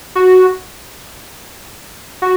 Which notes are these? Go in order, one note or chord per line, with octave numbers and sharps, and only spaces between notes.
F#4
F#4